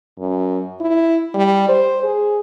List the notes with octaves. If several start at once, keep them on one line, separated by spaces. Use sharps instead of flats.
F#2
E4
G3
C5
G#4